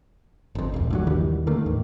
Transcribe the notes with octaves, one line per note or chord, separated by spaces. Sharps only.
G1 F2
D#1 A#1
D2 G2 F#3
D#2 D#3 E3 G3
D3 D#3 A3 A#3
E2 A2